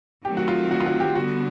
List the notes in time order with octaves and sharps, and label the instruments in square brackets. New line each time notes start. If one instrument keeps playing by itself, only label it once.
[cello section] D#3 F#3 A3 C4 [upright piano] G4
[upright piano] F#4
F4
F#4
F4
F#4
G4
[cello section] D3 G3 B3 [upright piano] F#4